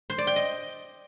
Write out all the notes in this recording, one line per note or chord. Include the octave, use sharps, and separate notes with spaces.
C5
D5
G5
D#5